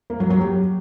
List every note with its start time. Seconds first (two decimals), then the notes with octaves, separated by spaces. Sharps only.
0.10 A#3
0.20 F#3
0.30 F#3
0.41 G4